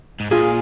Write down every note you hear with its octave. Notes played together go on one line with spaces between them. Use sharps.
G#2
A#2 F4 G#4